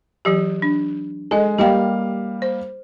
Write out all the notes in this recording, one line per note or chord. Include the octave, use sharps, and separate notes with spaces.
E3 F#3 G4
D4
G#3 A4 D#5
G3 A#3 G4 D#5 F5 G5
C5